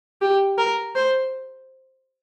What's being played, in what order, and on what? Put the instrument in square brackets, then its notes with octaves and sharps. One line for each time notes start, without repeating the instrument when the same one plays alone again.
[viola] G4
A#4
C5